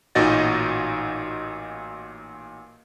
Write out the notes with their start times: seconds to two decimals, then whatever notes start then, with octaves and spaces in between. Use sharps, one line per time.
0.15 A1 A#2 D#4 F#4 D#5 A6